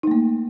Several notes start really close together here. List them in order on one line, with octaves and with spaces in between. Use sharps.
D#4 A3 A#3